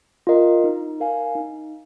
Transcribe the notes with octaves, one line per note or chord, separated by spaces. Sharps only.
F4 A#4 D#5
D#4
A#4 F5 G#5
D#4